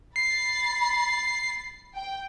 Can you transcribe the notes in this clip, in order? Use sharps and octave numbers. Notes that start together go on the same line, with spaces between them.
B5 A6 C7
G5